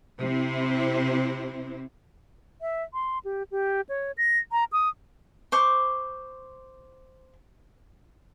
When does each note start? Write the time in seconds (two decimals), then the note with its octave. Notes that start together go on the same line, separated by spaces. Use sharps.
0.19 C3 C4 E4
2.61 E5
2.94 C6
3.25 G4
3.51 G4
3.89 C#5
4.18 A#6
4.52 A#5
4.73 D#6
5.52 C5 C#6 D6